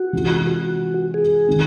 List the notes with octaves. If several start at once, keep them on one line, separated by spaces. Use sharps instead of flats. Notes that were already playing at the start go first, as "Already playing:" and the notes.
Already playing: F#4
C3 E3 G#3 C4 F4
F#4
G#4
D#3 G#3 C4 D#4